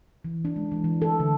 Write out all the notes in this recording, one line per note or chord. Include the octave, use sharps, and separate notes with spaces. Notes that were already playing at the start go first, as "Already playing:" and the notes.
E3
D4
G#3
E3
E3
A4
D3